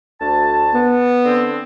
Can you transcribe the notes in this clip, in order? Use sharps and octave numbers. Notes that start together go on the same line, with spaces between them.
D2 A5
B3
D3 C4